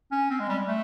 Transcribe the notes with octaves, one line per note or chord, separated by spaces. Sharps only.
C#4
C4
G#3
G3
A3